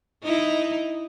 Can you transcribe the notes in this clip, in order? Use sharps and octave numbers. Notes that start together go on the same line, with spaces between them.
D#4 E4